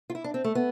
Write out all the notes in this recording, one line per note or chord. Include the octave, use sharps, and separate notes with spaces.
F4
E4
D4
C4
A3
B3